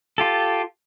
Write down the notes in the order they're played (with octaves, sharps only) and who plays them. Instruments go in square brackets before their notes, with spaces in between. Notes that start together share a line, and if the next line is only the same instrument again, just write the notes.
[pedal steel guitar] F4 G4 A4